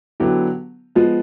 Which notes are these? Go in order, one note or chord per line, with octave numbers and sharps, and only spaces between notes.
D3 F#3 B3 E4 G4
F3 G#3 B3